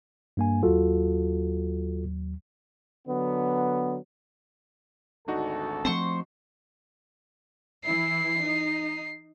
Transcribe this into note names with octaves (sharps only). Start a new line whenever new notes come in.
G2 A#3 G#5
D#2 F#3 F4 F#4 A4
D3 F#3 B3
G#1 D2 D4 D#4 F#4 A4
F3 A3 C4 C5 C6 C#6
E3 E4 C7
D#4